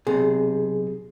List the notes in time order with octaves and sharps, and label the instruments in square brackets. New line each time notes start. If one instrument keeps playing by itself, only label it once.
[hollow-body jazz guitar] B1 C3 [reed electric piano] G#4